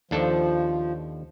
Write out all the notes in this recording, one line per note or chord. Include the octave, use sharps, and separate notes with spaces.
D#2 F3 D4 A4